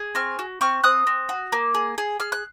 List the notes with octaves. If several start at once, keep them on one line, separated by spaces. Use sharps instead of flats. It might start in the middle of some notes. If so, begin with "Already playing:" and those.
Already playing: G#4
C4 C#6 F6
F#4
C4 C#6 F6
C4 D#6 F#6
C4
F#4
A#3
G#4
G#4
G#4 F6
F#6